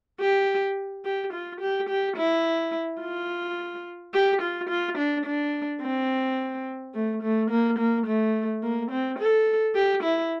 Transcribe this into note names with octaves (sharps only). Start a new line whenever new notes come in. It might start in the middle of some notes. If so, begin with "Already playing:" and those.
G4
G4
F4
G4
G4
E4
F4
G4
F4
F4
D4
D4
C4
A3
A3
A#3
A#3
A3
A#3
C4
A4
G4
E4